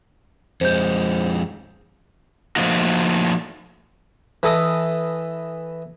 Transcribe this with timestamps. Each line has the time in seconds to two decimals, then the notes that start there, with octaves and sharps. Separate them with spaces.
0.61 F2 G#3 C5 G6
2.56 F3 A3 A#3 D#4 F#4
4.43 E3 A4 D#5 D#6